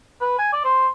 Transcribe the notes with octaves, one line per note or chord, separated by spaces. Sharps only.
B4
G#5
D5
C5